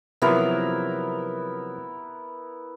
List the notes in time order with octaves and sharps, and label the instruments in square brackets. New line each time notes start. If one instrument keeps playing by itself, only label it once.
[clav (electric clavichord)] C3 F3 F#3 [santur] B3 E4 A#4